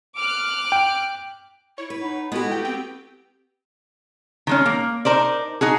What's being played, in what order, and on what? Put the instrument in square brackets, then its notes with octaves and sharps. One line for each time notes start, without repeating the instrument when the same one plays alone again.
[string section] D6 F6 F#6
[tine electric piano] G5
[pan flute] E4 [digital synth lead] C#5
[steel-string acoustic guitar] B4
[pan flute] D#4 [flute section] F#5 B5
[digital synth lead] G#3 [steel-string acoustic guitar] B3 G4 [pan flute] E4 [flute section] F#4 A4
[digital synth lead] G5
[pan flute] C4 [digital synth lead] G5
[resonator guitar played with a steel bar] D#3 G#3 C#4
A#3
D#4 A#4 C5 D5
D#4 F#4 G#4